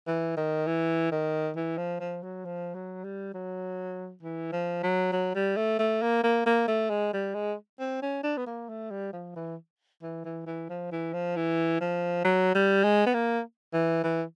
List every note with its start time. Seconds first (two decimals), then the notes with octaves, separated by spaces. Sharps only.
0.07 E3
0.37 D#3
0.67 E3
1.12 D#3
1.56 E3
1.78 F3
2.00 F3
2.23 F#3
2.45 F3
2.75 F#3
3.04 G3
3.34 F#3
4.22 E3
4.52 F3
4.83 F#3
5.12 F#3
5.35 G3
5.56 A3
5.79 A3
6.02 A#3
6.24 A#3
6.46 A#3
6.67 A3
6.90 G#3
7.13 G3
7.34 G#3
7.79 C4
8.02 C#4
8.23 D4
8.37 B3
8.46 A#3
8.69 A3
8.90 G3
9.13 F3
9.36 E3
10.03 E3
10.25 E3
10.46 E3
10.69 F3
10.91 E3
11.13 F3
11.36 E3
11.80 F3
12.25 F#3
12.55 G3
12.83 G#3
13.06 B3
13.14 A#3
13.73 E3
14.03 E3